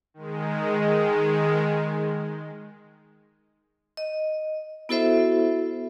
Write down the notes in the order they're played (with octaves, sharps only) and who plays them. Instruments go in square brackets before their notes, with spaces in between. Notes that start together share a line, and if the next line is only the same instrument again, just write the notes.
[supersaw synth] D#3 G#3
[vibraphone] D#5
B3 E4 F#4 A4 C5 E5